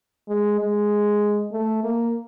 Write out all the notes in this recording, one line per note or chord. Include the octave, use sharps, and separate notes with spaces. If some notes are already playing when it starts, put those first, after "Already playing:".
G#3
G#3
A3
A#3